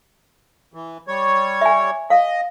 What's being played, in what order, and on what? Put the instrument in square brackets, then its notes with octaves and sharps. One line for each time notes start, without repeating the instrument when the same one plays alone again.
[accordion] E3
G3 C#5
[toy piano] E5 G#5
[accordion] D#5 [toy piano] F5